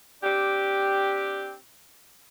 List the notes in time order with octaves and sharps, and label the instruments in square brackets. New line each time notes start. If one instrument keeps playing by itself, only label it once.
[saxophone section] C4 D4 G4